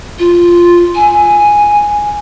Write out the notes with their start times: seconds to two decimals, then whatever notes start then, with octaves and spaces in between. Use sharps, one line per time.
0.19 F4
0.96 G#5